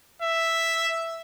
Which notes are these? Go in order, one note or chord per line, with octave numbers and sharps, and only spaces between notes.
E5